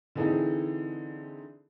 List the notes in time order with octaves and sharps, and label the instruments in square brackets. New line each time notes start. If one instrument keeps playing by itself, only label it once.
[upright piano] D3 E3 C4 D#4 G#4 A4